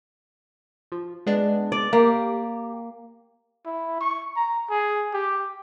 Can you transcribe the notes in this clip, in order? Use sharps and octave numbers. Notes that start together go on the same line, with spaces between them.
F3
G#3 B3 D4
D5
A#3 G4
E4
C#6
A#5
G#4
G4